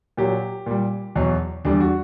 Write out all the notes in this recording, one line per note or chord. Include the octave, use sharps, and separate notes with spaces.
A#2 F#3 G4
A#2 G3
E2 B2 F#3
E2 D3 G3 D4
F#4